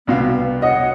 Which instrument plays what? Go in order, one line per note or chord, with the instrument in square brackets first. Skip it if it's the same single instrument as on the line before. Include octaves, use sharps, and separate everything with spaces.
[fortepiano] C2 B2 F5 [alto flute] B3
[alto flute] C#5 [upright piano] D#5 [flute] F#5